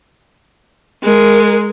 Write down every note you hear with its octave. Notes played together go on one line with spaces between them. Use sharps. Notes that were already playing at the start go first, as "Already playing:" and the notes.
G#3 A#4